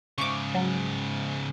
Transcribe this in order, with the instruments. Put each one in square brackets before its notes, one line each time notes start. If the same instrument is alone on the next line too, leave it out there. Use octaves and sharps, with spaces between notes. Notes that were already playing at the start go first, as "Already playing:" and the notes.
[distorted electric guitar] G#2 C#3 [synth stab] C#6 D6
[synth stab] F#3